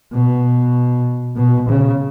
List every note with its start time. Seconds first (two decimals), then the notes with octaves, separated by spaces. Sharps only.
0.13 B2
1.36 B2
1.69 C#3